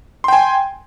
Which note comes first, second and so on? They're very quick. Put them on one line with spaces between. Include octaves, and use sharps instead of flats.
C6 G5 G#5